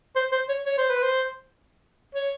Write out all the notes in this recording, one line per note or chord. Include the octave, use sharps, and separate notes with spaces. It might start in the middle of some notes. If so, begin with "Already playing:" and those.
C5
C5
C#5
C#5
C5
B4
C5
C#5